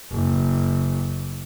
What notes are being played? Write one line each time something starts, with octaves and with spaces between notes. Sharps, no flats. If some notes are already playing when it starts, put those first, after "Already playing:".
F#1